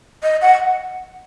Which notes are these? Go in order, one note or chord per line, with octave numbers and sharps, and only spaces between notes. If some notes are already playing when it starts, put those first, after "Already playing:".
D#5
F#5